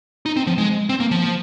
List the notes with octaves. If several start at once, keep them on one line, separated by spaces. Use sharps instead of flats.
D#4
C4
F3
G#3
C4
A#3
F3